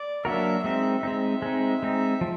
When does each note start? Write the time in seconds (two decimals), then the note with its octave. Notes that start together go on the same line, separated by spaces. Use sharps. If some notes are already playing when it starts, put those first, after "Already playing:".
Already playing: D5
0.25 F#3 A#3 D4 F#4 A#4 E5
0.64 G#3 C4 D#4 E5
1.03 G#3 C4 D#4 E5
1.42 G#3 C4 D#4
1.82 G#3 C4 D#4
2.21 F3